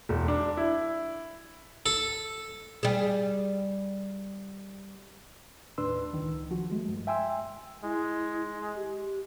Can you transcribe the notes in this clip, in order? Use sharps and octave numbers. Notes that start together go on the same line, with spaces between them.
E1
D4
E4
A4
G3 G#4
D#2 A2 D4 B4 C6 E6
C#2 D#3
F3 F#4
G#3 A3
G2
E5 G5 G#5 C6 E6
G#3 E4
G4